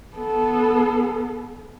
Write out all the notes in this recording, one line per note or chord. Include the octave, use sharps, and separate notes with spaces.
B3 A4